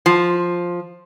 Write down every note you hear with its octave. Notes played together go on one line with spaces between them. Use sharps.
F3